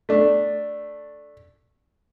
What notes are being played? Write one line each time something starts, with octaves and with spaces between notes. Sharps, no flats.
A3 D4